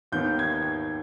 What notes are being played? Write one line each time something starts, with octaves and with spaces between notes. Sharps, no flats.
D#2 D#3 B3 G6
G#6
G#6